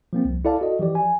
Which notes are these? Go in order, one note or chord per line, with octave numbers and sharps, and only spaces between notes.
F3 A#3 C4
C2
E4 A4 D5 F5 A5
F#4 A4 D#5
E3 F3 G4 D5
G#5